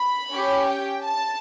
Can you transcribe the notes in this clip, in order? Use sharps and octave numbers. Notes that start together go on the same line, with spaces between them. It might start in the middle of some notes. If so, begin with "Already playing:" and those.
Already playing: B5
C#4 G4
G5
A5